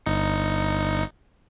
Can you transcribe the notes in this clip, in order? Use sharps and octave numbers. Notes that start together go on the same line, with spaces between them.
G1 D#4 C#7